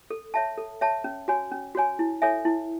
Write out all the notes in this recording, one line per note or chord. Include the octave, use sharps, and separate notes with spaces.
A4
C#5 E5 A5
A4
C#5 E5 A5
C#4
F#4 C#5 G#5
C#4
F#4 C#5 G#5
E4
A4 C#5 E5 G#5
E4